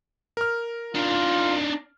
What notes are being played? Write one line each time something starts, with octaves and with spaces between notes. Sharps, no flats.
A#4 F6
D4 D#4 F4